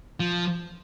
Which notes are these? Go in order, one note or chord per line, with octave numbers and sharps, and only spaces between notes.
F3